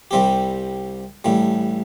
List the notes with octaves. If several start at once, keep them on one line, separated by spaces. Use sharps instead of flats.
C2 C3 G3 C4 G4
A1 A2 G3